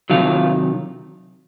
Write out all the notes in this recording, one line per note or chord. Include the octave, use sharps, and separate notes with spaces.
C3 D#3 F#3 F4 F5